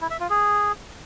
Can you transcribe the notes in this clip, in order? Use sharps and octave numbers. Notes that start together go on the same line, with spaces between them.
E4
E5
F4
G#4